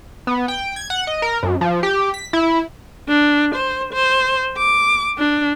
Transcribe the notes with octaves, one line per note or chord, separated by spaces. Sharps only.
B3
G5
G#6
F#5
D#5
A#4
F#2
F3
G4
B6
E4
D4
C5
C5
D6
D4